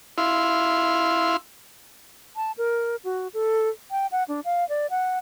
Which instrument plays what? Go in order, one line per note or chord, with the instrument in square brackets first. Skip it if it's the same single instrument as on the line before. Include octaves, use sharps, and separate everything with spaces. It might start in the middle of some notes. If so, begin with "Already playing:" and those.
[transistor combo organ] E4 F5 C6
[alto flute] A5
A#4
F#4
A4
G5
F#5
D4
F5
D5
F#5